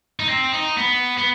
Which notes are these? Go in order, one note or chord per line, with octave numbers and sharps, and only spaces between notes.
D#4
C4
D#4
B3
B3